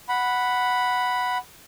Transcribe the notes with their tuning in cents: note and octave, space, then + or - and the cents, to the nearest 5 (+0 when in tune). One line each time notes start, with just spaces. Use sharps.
F#5 +0 B5 +0